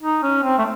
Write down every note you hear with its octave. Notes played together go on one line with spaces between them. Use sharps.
D#4
C#4
C4
A3